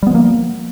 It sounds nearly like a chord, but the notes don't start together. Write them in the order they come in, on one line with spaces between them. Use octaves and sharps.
G3 B3 F3 A#3